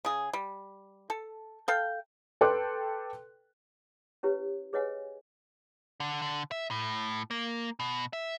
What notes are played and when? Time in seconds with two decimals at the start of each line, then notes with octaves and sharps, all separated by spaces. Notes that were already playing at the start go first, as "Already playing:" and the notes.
0.05 C#3 G#4
0.33 G3
1.10 A4
1.68 A4 F5 G5
2.41 A4 B4 G5 C6 D6 F#6
4.23 C#4 E4 G4 B4 C#5
4.73 G#4 B4 C#5 D#5 F#5 G#5
6.00 D3
6.22 D3
6.51 E5
6.71 A2
7.31 A#3
7.80 B2
8.13 E5